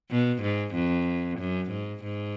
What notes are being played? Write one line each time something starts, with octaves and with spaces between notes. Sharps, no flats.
B2
G#2
F2
F#2
G#2
G#2